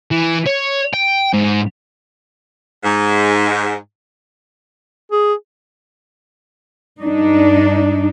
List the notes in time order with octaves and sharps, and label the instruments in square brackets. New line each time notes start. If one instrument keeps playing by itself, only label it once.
[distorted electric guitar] E3
C#5
G5
G#2
[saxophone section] G#2
[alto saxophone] G#4
[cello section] G2 D4 D#4